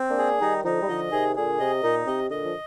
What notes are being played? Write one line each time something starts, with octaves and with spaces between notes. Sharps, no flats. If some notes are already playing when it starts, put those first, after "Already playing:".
Already playing: C4
A#3 D4
G#4
D#3 G3 D#4
D3 F3 D#4
G3
D3 F3 D#5
C3 D#3 G#4
A#2 D3 G#4
C3 D#5
A#2 D#4
C3 D#5
A#2 D3 D#5
F3